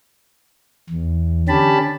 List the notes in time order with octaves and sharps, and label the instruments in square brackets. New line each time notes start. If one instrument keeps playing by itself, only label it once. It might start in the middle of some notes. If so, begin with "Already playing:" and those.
[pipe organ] E2
D3 C#4 G4 A5 B5